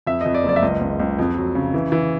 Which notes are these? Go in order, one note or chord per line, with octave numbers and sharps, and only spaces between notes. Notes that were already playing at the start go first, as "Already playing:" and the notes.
F2 E5
F2 D#5
D5
F#1
D5
E5
C#2 D#5
C#2
C#2
F2
F#3
C#3
E3
E3